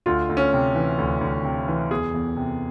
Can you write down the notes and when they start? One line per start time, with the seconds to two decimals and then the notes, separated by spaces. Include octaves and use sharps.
0.06 D2 F4
0.29 D2
0.37 C#4
0.53 C3
0.75 E3
0.98 D2
1.21 D2
1.44 C3
1.68 E3
1.90 E2 G#4
2.14 E2
2.37 C3